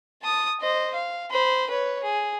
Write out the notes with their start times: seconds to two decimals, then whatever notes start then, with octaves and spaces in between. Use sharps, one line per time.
0.22 A5 D#6
0.60 C5 D#5
0.94 F5
1.30 C5 B5
1.69 B4 C#5
2.03 G#4